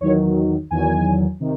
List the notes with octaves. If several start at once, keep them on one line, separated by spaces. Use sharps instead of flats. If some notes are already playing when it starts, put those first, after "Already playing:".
E2 D#3 F#3 C#5
E2 D#3 F#3 G#5
C3 D#3